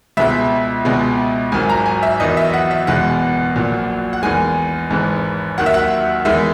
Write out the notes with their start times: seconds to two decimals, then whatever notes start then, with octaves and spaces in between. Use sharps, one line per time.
0.17 C#2 B2 G#3 E5
0.85 C#2 B2 G#3
1.52 G#1 G#2 D#3 F#3 G#5
1.70 A#5
1.86 G#5
2.03 E5
2.20 E2 D#3 F#3 D#5
2.37 E5
2.54 F#5
2.71 E5
2.87 F#1 E2 B2 G#3 F#5
3.55 A#1 A#2 F#3
4.13 F#5
4.23 E2 D#3 G#3 G#5
4.91 G#1 G#2 E3 G#3
5.58 D#2 D#3 F#3 F#5
5.66 E5
5.74 F#5
6.25 E2 D#3 G#3 E5